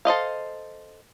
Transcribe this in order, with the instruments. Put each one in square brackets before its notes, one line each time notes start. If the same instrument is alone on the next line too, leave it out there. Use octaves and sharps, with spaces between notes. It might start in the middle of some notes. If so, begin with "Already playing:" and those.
[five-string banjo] A4 C5 D#5 F5